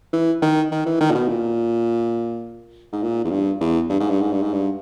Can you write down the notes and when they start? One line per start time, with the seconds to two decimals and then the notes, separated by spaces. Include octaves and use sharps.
0.13 E3
0.42 D#3
0.72 D#3
0.86 E3
1.00 D#3
1.11 A#2
1.15 B2
1.28 A#2
2.93 G#2
3.03 A#2
3.24 E2
3.31 G2
3.60 E2
3.89 G2
4.00 G#2
4.10 G2
4.21 G#2
4.32 G2
4.42 G#2
4.53 G2